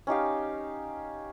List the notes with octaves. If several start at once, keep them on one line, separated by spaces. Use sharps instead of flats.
C#4 D#4 G4 F5